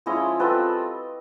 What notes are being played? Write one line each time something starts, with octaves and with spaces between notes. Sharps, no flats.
F3 G#3 C#4 E4 C#5 D#5
G3 C4 F4 A4 B4